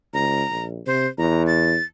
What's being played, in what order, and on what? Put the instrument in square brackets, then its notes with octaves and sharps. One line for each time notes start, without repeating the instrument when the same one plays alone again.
[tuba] C#2 [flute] A#5
[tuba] A#1
[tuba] C3 [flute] C5
[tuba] E2 [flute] A#5
[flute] A6